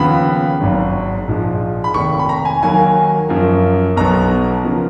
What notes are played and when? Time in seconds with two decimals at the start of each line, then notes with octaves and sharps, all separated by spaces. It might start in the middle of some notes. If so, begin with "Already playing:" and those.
Already playing: D#2 C#3 F3 B3 B5
0.60 G#1 G#2 F#3
1.28 A#1 G#2 F3 G#3
1.84 B5
1.94 F1 D#2 D#3 C#6
2.19 B5
2.29 A#5
2.45 G#5
2.62 D#2 D#3 F#3 A#3 G#5
3.29 F#2 F3 A#3
3.96 B1 B2 F#3 B3 A#5
4.65 C#3 F3 A#3